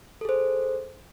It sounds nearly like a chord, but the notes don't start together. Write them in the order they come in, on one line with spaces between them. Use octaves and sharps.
A4 G#4 C5